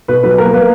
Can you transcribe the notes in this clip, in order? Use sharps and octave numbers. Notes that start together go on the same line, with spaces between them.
B2 B4
F#3 B4
A#3 A#4
A#3 B4